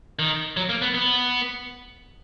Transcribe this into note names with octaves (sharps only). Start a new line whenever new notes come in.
D#3
F#3
A#3
B3
B3